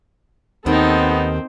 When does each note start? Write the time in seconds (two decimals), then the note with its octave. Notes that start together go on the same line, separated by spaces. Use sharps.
0.66 D#2 D#3 B3 C4 D#4 A4